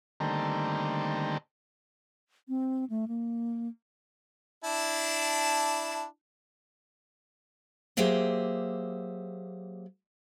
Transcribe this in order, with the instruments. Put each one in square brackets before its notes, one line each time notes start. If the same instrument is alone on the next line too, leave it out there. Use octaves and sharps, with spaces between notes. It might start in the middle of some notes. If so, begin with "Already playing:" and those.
[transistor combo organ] D3 D#3 G3 A3 A#3 C4
[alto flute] C4
A3
A#3
[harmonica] D4 E4 A5
[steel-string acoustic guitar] F#3 A#3 G4 G#4 C5 E5